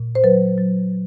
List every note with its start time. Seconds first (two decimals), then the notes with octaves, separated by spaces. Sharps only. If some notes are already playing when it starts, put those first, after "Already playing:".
Already playing: A#2
0.15 C5
0.24 F#3 B4
0.58 F#3